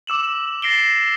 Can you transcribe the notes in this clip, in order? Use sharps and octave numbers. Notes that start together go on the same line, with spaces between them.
D6 E6 E7 F#7
A6 A#6 C7 D7 G7